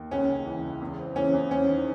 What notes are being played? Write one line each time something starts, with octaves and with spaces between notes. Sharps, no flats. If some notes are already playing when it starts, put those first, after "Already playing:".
Already playing: D#2
C#2 C#4
C#2
E3
C#2
E2
C4
E3 C#4
E2
C4 C#4
D#3